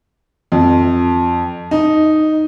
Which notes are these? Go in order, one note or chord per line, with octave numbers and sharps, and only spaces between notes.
F2
D#4